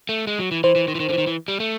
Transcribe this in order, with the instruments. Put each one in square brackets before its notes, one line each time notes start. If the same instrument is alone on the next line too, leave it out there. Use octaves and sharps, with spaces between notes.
[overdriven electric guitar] A3
G#3
F#3
E3
[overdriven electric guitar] E3 [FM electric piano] C5
[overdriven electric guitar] E3
D#3
E3
D#3
D3
E3
D#3
E3
G3
A3